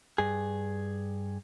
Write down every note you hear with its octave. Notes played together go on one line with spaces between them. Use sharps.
G2 G#4